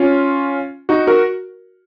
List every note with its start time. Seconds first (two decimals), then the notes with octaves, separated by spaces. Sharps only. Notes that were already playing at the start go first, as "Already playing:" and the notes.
Already playing: C#4 F4
0.89 D#4 F#4
1.07 F#4 A#4